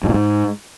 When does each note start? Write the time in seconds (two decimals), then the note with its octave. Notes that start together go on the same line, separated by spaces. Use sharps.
0.04 G2
0.09 A#2
0.14 G#2